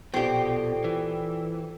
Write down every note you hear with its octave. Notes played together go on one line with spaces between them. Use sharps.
A#1 B2 C4 F4 G4 A4 D5
E3